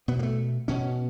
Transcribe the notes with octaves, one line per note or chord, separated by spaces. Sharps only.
B2 B3
A#3
A3
B2 C#4